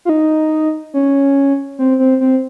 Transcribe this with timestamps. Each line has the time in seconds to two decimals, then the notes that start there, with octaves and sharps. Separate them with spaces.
0.05 F4
0.09 D#4
0.94 C#4
1.79 C4
1.99 C4
2.21 C4